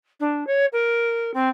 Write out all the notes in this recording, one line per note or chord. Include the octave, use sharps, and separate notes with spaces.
D4
C#5
A#4
C4